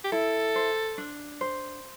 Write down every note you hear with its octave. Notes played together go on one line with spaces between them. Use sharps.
G4
E4 A4
C5
D4
C5